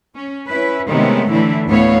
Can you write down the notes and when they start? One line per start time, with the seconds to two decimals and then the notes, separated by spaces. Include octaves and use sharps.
0.15 C#4
0.48 C#4 E4 B4
0.88 C3 D#3 G#3 A3 B3 C#4
1.30 A2 D3 E3 A3 D4 E4
1.67 D2 A2 B3 C#5 F5